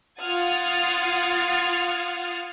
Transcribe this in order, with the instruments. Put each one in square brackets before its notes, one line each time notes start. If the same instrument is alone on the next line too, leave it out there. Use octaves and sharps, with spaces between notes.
[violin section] F4 F#5 D#6 F6 G#6 A6